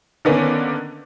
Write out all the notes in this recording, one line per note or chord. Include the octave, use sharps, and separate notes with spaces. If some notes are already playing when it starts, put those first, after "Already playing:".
D3 D#3 A#3 B3 C#4 D4